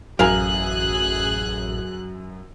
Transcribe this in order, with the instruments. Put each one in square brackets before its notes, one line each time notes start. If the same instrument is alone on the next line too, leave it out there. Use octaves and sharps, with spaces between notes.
[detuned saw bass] A1 [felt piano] F#2 [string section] G#4 F#6 [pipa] A#4 F5 G#5